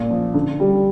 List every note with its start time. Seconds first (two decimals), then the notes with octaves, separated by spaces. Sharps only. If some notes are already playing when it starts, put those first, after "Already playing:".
Already playing: A#2
0.11 F3
0.34 D3
0.60 G3